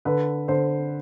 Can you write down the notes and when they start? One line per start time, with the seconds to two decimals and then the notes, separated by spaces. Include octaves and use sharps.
0.05 D3 B4
0.48 D3 C5